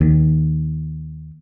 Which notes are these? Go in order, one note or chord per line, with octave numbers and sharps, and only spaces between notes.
D#2